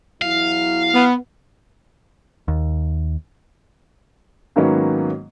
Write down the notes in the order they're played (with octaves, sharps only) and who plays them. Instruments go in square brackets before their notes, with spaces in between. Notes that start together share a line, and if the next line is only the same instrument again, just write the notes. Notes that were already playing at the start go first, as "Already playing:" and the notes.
[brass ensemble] E2 F#3 E4 [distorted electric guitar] F5
[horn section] B3
[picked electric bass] D#2
[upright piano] G#2 D#3 F#3 A#3 B3 C#4